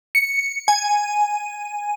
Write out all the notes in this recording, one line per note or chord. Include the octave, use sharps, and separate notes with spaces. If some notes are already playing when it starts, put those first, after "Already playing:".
C#7
G#5